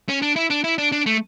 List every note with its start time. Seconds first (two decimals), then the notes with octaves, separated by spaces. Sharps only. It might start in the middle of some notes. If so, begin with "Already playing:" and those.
0.09 C#4
0.22 D4
0.36 E4
0.50 D4
0.64 E4
0.78 D4
0.92 D4
1.06 A3